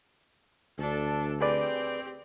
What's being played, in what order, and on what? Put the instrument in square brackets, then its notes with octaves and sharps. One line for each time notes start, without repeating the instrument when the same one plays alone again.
[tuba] D2 [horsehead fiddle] D4 A4
[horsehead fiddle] C4 G4 [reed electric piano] G#4 B4 D5